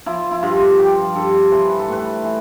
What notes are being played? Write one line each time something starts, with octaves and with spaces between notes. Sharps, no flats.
F3 E4
E4
G2 F4
F3 G4
G2 A4
E3 C5
B4
A4
A2 B4
E3